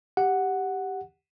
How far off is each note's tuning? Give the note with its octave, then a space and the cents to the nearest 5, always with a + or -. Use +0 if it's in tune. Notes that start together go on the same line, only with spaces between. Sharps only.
G4 +0 F#5 +0